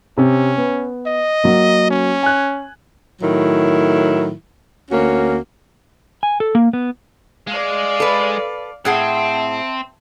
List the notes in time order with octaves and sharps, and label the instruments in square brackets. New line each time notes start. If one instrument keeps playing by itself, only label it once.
[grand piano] C3 [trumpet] C#4
[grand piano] B3
[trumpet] D#5
[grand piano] F#3 A#3
[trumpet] C#4
[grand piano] G#5 F#6
[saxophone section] A2 D#3 F#3 E4
D2 A#3 C#4 F#4
[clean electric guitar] G#5
A4
A#3
B3
[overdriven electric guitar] G#3 [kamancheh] D5 F5
[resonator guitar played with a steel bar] A4 B4
[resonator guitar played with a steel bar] A2 G#4 F#5 [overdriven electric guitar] C4 [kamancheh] E5 A5